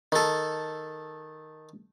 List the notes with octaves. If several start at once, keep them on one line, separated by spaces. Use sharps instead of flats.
D#3 A4